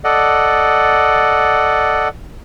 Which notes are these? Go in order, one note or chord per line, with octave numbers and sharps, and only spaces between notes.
A4 D5 D#5 F#5